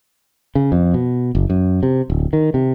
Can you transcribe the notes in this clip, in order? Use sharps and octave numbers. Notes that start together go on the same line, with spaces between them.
C#3
F2
B2
F#1
F#2
C3
D1
D#3
C3